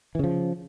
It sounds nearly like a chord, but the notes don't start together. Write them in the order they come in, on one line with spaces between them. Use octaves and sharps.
E3 C#3 F3